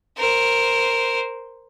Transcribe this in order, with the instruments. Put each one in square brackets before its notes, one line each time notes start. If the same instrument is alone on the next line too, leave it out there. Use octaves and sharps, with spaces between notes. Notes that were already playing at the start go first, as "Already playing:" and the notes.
[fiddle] A#4 C5